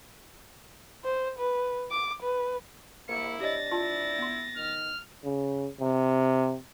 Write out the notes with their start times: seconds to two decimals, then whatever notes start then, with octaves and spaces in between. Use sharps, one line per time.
1.04 C5
1.39 B4
1.91 D6
2.22 B4
3.09 A#3 E4 C#7
3.41 D4 G4 C#5 D#5 A6 A#6
3.72 E4 F4 A5
4.19 B3 C6
4.57 D#3 F6
5.24 C#3
5.81 C3